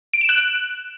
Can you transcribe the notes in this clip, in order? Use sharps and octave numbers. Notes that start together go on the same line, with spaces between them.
D7
E7
F#6